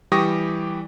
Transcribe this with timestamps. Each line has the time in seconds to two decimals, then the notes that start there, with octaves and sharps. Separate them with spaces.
0.12 E3 G3 G4 C#6 D#6 A#6